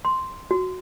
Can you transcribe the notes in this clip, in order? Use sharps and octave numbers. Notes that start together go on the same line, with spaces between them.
C6
F#4